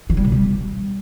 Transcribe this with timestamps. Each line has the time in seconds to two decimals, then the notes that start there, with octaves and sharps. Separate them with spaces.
0.10 E3
0.17 G3
0.24 B2
0.32 G3